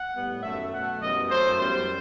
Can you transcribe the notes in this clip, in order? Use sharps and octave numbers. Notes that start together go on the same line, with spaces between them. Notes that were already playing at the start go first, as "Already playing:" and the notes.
Already playing: F#5
A2 G3 B3
F#2 D#3 A3 E5
B2 A3 F#5
F#2 E3 G3 B3 D#5
F#2 F#3 A3 C5
F#2 E3 G3 B3 C5